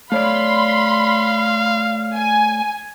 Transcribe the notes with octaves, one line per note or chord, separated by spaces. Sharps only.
A3 C#5 D5 F5 B5 C6
G#5